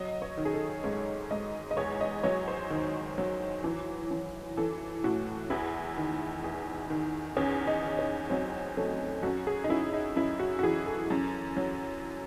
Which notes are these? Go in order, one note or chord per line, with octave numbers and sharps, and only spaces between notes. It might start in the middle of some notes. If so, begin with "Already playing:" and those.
Already playing: F#3 D#5
C#5
D#3
G#4
A4
G#2 C#5
G#2 D#5
D#5
E2 C#5
D#5
F#3 C#5
C5
D#3
F#3
E3
E3
E3 A4
A2 F#4
E2 E4
D#3
E2
D#3
E2 C#4
D#4
D#3
C#4
F#3 C4
F#3 A3
F#2 F#4
G#4
D#4
F#2 E4
D#4
F#2 E4
F#4
F#4
E3 G#4
A4
F#2
F#3